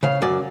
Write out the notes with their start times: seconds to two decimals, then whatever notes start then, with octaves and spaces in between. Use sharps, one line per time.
0.03 C#3 F5
0.22 F#2 D5